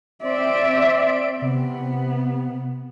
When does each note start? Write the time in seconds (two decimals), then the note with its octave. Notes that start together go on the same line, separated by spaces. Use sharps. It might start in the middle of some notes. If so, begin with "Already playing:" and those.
0.23 C4 D5 E5 C6 D7
1.42 C3 B3